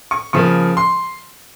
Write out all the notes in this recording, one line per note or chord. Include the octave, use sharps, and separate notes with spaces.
C#6
C#3 F3 A#3 C#6
C6